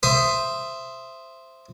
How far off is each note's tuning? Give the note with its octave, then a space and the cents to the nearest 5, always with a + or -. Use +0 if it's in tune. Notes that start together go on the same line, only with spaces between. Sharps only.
C5 +0 E5 +15 D#6 +0